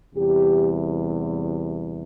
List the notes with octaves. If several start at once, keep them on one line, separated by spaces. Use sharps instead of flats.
E2 C3 E3 G3 G4